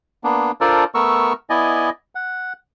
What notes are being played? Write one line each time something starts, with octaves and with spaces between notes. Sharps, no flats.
A#3 B3 D4
D4 F4 A4 A#4 C5 D5
A3 B3 A#4 C#6 E6
B3 E4 D5 D#5 G#5
F#5